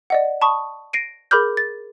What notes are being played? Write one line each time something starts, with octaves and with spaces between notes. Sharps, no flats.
D5 D#5 F#5
A5 B5 C#6 D#6
A#6 C7 D7 D#7
G#4 A#4 B5 D6 F6 G6
A6